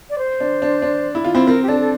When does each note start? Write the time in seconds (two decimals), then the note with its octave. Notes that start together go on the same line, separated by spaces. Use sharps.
0.10 D5
0.18 C5
0.40 D4
0.62 D4
0.82 D4
1.15 E4
1.24 F4
1.35 C4 E4
1.47 C4 A#4
1.63 G4
1.68 D4 A4
1.80 A4